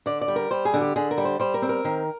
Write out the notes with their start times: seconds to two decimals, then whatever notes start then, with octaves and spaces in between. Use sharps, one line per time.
0.06 D3 D5
0.21 D5
0.28 G3
0.36 A#4
0.51 G3 C5
0.65 G#4
0.74 D3
0.81 G4
0.96 D3 G#4
1.11 A#4
1.18 G3
1.25 C5
1.40 G3 C5
1.54 A#4
1.62 C4
1.69 A#4
1.85 D#3